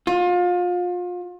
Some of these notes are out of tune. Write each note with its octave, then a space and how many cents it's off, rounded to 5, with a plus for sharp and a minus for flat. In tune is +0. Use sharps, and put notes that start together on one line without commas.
F4 +30